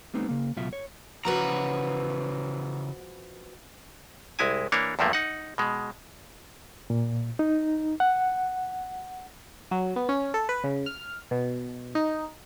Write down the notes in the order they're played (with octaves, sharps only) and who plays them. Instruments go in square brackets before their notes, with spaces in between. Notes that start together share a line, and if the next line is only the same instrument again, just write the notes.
[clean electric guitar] G3 A3 B3 C4 D#4
C#3 A#3
C#2 B2 F#3 F4 E5
C#5
[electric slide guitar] C#3 E3 A#5 [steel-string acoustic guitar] F3 F#4 B4
[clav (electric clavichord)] C2 G#3 E4 G#5
E3 A#3 D4 C#5
E2 G2 F3 A3 A#3
D#4 F#5
B2 G#3
[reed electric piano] A#2
D#4
F#5
[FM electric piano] F#3
B3
C#4
A4
B4
C#3
F6
B2
D#4